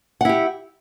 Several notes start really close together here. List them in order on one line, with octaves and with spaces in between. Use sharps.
F#5 E4 G4